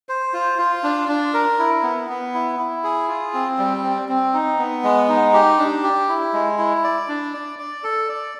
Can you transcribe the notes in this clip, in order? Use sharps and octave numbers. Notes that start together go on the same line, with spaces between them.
C5
F4
F4
D4
D4
A#4
E4
B3
B3
E4
E4
G#4
F4
C4
G3
C4
C4
D#4
B3
G#3
D#4
G4
D4
G4
E4
G#3
E4
D5
D4
D5
D5
A4
D5